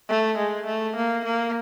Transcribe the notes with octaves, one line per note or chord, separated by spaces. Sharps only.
A3
G#3
A3
A#3
A#3